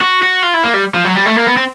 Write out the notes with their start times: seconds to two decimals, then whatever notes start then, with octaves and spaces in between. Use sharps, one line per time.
0.01 F#4
0.22 F#4
0.42 F4
0.54 E4
0.64 A#3
0.74 G3
0.95 F3
1.05 F#3
1.16 G3
1.26 A3
1.36 A#3
1.47 B3
1.57 C4